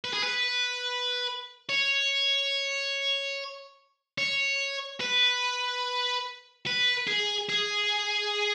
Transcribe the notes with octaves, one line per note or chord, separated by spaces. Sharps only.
B4
G#4
B4
C#5
C#5
B4
B4
G#4
G#4